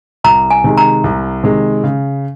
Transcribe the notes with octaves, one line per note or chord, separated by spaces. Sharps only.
C2 A#5
G#5
C3 D#3 G#3
A#5
C2
C3 D#3 G#3
C#3